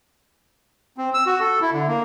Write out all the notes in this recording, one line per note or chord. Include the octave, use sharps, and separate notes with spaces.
C4
E6
F#4
A4
E4
D3
A#3